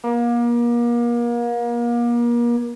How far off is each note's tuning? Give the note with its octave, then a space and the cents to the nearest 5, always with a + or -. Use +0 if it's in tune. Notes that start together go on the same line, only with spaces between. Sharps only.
A#3 +35